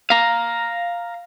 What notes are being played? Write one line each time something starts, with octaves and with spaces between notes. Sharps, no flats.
F5 A#5